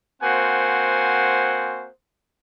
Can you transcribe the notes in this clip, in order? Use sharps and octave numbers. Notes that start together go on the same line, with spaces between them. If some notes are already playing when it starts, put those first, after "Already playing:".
A#3 C4 F#4 C5 F#5 G#5